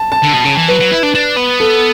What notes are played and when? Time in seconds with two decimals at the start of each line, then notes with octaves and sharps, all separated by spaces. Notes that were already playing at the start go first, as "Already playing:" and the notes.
Already playing: A5
0.12 A5
0.23 D3
0.34 B2
0.45 C#3
0.57 E3
0.68 F#3 B4
0.80 F#3
0.92 E4
1.03 D4
1.15 D4
1.36 B3
1.60 A4